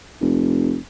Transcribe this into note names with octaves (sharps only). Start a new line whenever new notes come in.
F1